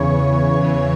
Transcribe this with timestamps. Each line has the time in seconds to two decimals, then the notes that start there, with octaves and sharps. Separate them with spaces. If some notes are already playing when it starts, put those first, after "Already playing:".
Already playing: E2 C#3 E3 C#5
0.19 E2
0.63 C#3 E3